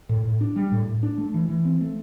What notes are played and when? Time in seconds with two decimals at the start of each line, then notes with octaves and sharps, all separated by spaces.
0.09 A2
0.25 A2
0.41 D4
0.56 G3
0.72 A2
0.87 A2
1.03 D4
1.18 A3
1.34 E3
1.49 E3
1.65 C4
1.81 A3